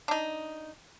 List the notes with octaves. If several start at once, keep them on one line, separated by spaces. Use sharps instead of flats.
D4 D#4